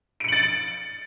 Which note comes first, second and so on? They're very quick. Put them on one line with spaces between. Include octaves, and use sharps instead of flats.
D7 C#7 F#7 A6